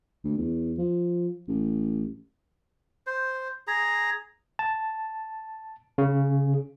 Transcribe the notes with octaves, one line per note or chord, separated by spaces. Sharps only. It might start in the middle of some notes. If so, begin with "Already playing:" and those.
D2
E2
F3
A1
C5
G#4 A#5
A5
C#3